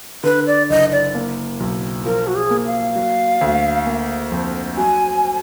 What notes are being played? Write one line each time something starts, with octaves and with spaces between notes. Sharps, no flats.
D3 B4
D5
F#1 D#5
D5
A#3
B1
F3 A#4
F#4
G#4
A#3
F5
F#3
D2
A#3
F2
F#3 G#5